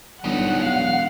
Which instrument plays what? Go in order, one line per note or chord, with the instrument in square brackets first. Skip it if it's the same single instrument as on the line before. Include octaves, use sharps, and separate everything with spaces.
[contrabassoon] G1 [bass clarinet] F#3 [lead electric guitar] G3 D#4 [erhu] F#5
[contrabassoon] E1 [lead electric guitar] F5